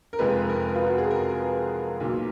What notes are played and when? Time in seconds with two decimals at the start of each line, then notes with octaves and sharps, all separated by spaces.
0.13 A#4
0.19 F1 F2 F3 G#3 B4
0.49 A#4
0.75 F4
0.87 F#4
0.98 G#4
1.10 A#4
2.00 B1 A#2 F#3